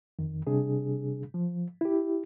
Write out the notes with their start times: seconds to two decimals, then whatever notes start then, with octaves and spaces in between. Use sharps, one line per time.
0.19 F2 D#3
0.47 C3 G3 D4 G#4
1.34 F3
1.81 E4 G4